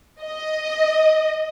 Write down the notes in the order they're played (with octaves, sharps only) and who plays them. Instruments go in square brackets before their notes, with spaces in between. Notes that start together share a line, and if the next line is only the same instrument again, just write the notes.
[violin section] D#5